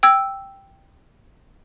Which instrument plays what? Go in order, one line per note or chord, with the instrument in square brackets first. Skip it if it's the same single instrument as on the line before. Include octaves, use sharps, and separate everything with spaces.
[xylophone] G5 E6 G#6